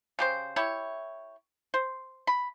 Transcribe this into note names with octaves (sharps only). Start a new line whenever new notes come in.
C#3 G4 C5
E4 G4 C#5
C5
B5